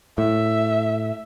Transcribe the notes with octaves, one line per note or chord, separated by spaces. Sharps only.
A2 E5